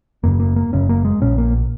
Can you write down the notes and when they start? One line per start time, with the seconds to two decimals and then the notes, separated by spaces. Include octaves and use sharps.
0.23 F#1 F#2 C#3 A#3
0.40 A#3
0.56 A#3
0.72 F#1 F#2 C#3 C#4
0.89 A#3
1.05 G#3
1.21 A#1 A#2 C#4
1.38 A#3